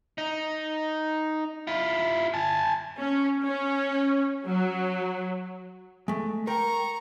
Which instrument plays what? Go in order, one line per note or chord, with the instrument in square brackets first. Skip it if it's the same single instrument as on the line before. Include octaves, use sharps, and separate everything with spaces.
[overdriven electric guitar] D#4
E4 F4
G#5 A5
[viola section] C#4
C#4
F#3
[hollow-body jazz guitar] G#3 A3
[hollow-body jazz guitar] A#4 G5 [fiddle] A#5 C#6